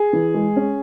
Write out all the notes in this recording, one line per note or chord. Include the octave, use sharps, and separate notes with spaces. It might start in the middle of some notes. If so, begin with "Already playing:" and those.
Already playing: G#4
E3
G#3
C#4